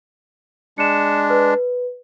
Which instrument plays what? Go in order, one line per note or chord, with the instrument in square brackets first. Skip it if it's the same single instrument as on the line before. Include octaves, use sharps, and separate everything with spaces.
[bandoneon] G#3 D4 [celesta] C#7 E7
[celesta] B4